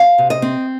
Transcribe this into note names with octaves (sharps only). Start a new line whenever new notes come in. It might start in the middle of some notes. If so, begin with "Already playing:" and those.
Already playing: F5
C3
D#5
C4